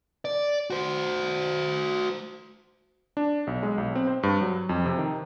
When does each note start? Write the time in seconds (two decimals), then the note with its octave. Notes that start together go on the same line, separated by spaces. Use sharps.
0.25 D5
0.70 F#4 C5
3.17 D4
3.47 B1
3.63 G#3
3.78 B1
3.95 C4
4.07 C5
4.23 G2
4.41 F#3
4.69 F2
4.86 C3
4.98 D#3